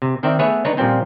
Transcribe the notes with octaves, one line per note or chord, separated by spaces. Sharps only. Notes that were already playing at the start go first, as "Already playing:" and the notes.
C3
D#3 C4 D#4 D5 E5 G5
A3 B3 G#4 B4 C#5 E5
D4 D#4 B4 C#5
A#2 F3 G3 A#3 C4 C#4